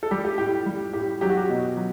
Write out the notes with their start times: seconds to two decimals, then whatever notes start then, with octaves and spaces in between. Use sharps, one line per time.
0.03 A4
0.11 G3 G4
0.25 G4
0.38 A2 G4
0.66 G3
0.93 A2 G4
1.21 F#3 G4
1.30 F#4
1.37 G4
1.49 B2
1.77 F#3